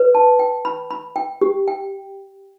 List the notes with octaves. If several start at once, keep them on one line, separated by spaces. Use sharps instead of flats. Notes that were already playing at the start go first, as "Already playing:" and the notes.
Already playing: B4
A5
G5
B5
B5
G5
G4
G5